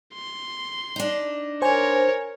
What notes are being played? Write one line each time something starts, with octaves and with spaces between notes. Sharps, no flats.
C6
D4 D#4
A#4 C5 C#5 G#5